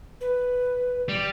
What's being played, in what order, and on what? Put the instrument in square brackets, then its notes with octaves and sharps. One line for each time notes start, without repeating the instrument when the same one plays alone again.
[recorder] B4
[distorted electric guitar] G3